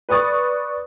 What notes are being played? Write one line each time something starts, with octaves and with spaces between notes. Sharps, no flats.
B4 D5 C#6 D#6 A6